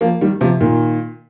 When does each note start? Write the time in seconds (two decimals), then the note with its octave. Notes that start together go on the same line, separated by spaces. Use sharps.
0.01 F3 A#3
0.21 D#3 G3
0.41 C3 F3
0.61 A#2 D#3